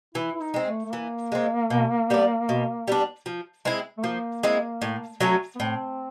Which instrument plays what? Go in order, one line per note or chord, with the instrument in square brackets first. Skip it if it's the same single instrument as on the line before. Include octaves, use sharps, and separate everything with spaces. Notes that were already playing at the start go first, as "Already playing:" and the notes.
[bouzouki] E3 [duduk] E4
[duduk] E4
D#4
[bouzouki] G#3 C4
[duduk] A3
A3
[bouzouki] E3 [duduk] A#3
[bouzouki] G#3 C4
B2
G3 B3 D4
B2
G3 B3 D4
F3
G#3 C4 E4
[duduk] A3
[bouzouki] F3 [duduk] A#3
[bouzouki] G#3 C4 E4
A2
F#3 A3 C#4
[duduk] B3
[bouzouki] A2 [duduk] C4